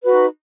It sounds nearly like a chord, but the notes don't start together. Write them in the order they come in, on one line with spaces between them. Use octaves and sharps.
B4 F#4 D#4